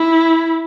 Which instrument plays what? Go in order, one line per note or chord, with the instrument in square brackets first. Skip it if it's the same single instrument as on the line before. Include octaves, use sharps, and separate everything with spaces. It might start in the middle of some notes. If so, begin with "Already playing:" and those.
Already playing: [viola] E4